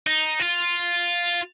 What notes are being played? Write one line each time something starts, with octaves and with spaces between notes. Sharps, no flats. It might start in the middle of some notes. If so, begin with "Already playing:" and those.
D#4
F4